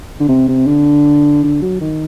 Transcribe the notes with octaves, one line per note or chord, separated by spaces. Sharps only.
D3
C3
C3
D3
D3
F#3
D#3